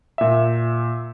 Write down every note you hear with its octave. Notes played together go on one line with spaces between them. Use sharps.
A#2 E5